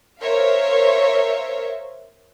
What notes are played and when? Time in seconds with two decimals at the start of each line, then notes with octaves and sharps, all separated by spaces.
0.20 A#4 C5 C#5 E5 F5